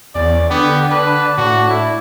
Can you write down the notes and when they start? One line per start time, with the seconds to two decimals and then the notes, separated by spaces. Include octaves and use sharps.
0.15 E2 C#4 D5
0.50 D3 B3 G4 G5
0.91 D4 B4 A5
1.38 A2 F#4
1.70 E4